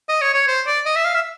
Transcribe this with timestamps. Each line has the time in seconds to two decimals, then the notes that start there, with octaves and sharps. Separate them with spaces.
0.09 D#5
0.21 C#5
0.34 C#5
0.47 C5
0.67 D5
0.86 D#5
0.96 E5
1.05 F5
1.15 E5